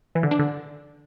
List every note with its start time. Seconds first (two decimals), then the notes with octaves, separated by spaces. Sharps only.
0.15 E3
0.23 D3
0.31 D4
0.39 D3